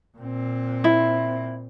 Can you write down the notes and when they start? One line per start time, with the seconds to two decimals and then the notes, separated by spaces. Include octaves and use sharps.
0.18 A#2 C4
0.84 E4